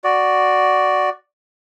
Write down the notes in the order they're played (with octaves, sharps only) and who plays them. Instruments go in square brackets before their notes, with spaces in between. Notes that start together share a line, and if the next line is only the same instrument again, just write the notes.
[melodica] F#4 D5